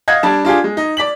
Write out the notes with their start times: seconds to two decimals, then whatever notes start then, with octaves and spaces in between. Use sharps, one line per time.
0.08 D#5 F5 F#5 G#6
0.23 G3 D4 A5
0.45 D4 F4 G4 G#4
0.64 G#3
0.77 D#4
0.97 D5 B6 F#7